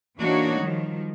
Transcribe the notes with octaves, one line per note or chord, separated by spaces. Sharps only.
E3 A#3 D4 D#4 F#4 C#5
D#3 F3 G3